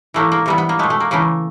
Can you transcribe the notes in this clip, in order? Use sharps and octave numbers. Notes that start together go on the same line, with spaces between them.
A2 E3 A3 A#3
A#3
C3 E3 G3 B3
B3
A#3
B2 G#3 A3
A3
A#3
C#3 E3 A3 A#3